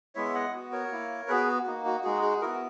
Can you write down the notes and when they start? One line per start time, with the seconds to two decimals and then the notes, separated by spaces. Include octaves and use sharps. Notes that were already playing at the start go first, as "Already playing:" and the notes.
0.15 G#3 B3 E4 C#5 E5
0.34 D#5 F#5
0.53 B3 F#4
0.72 A#4 C#5
0.91 A#3 E4
1.28 B3 F#4 G#4 B4
1.66 A#3 D#4 F#4
1.86 F#4
2.04 G#3 D#4 F#4 G#4
2.22 G#4
2.41 B3 E4 F#4 A#4